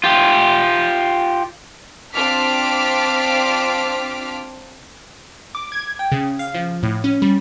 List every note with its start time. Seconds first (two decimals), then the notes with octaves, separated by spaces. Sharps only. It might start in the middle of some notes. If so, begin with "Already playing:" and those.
0.04 F4 G4
2.13 C4 D4 F4 D6 F6 B6
5.55 D6
5.72 G#6
5.99 G5
6.12 C#3
6.39 F5
6.55 F3
6.83 A2
7.04 C#4
7.22 G3